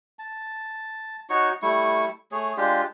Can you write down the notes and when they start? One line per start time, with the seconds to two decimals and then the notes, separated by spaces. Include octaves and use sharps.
0.19 A5
1.30 D#4 F#4 C#5 C#6
1.62 G3 A3 E4 C#6
2.32 A3 G#4 C#5
2.57 G#3 D4 F4 G4